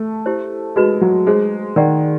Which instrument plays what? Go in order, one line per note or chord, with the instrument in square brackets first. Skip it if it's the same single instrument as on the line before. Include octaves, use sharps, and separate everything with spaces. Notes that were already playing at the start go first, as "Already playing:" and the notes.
Already playing: [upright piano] A3
[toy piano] E4 G4 C5
[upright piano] G#3 [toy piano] D#4 F#4 B4 D#5
[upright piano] F#3
[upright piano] G#3 [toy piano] D#4 G#4 C5
[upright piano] D#3 [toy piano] A#4 D5 F#5 A#5